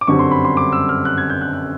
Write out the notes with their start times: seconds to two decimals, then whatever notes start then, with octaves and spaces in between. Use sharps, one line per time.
0.01 D6
0.07 G1 F#2 D3 G3 C4 C#6
0.19 C6
0.31 B5
0.45 C6
0.57 D6
0.72 E6
0.89 F6
1.05 F#6
1.18 G#6
1.30 G6
1.41 F#6
1.53 F#6